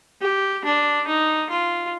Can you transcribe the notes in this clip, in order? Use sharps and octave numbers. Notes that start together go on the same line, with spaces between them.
G4
D4
D#4
F4